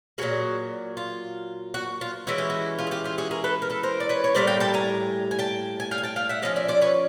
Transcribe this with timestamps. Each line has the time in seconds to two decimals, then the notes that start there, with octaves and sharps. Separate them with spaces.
0.18 A#2 F#3 A#3 F#4 G#4
0.97 F4
1.74 F#4
2.01 F4
2.27 E3 G#3 C#4 E4 F#4
2.38 G4
2.50 F#4
2.79 F4 G4
2.87 G#4
2.91 F4 G4
3.04 F4 G4
3.18 F#4 G#4
3.31 G#4 A#4
3.44 A4 B4
3.62 A#4
3.70 A4 B4
3.83 A#4 C5
4.00 D5
4.09 B4 C#5
4.24 C#5
4.35 A2 E3 G3 A#3 C5 D5
4.47 F5 G5
4.60 G5 A5
4.74 G#5 A#5
5.31 G#5
5.39 G5 A5
5.80 G#5
5.91 F5 G5
5.98 G#5
6.03 G5 A5
6.16 F5 G5
6.29 E5 F#5
6.42 F3 G#3 C#4 D#5 F5
6.56 D5 E5
6.68 C5 D5
6.82 B4 C#5